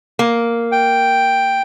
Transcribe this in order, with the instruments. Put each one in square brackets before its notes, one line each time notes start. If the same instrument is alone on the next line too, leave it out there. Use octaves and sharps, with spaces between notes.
[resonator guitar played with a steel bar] A#3
[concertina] G5